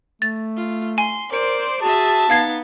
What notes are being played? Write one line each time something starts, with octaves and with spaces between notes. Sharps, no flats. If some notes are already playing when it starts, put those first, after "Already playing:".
A3 A6
F4
G#5 C6
A#4 C5 D5 D7
F#4 G#4 E5 A5
B3 D#4 F5 G#6 A6 C7